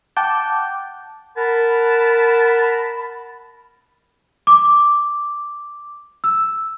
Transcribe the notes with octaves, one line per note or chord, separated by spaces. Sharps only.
F#5 G5 A5 D6 G6
A#4 F#5 A5 B5
D6
E6